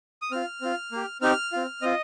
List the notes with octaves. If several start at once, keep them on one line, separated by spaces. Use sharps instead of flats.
D#6
C4 F4 F6
C4 F4
A#3 G4
C4 D#4 G4 F6
C4 F4
C4 F4 D#5